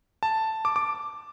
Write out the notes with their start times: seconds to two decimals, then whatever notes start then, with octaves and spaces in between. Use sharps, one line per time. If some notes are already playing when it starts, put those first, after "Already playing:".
0.23 A5
0.65 D6
0.76 D6